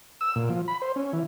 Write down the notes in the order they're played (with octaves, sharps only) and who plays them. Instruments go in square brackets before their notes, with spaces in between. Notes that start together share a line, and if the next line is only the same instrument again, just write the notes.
[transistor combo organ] E6
A#2
F3
B5
C5
C#4
E3